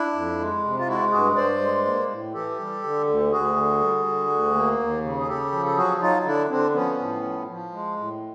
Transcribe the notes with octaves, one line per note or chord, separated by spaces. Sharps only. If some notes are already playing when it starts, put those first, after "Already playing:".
Already playing: D4 E4
F2
G#3
C3
F4
G#3 E4 F#4
G2 F#4 G#4
G2 C5 D5
G#3
A#3
A2
E3 G4 A4
G3
D3
D2
D2 F#4 G#4
D3
G3
D3
D2
A#3
D#2
C#3
G#4
C#3 G4 A4
F3
A4
F#3 F#4 G#4
F#3 D#4 F4
D3 D4 E4
D3 C4 D4
F3 B3 C#4
A2
F3
F3
G#3
A2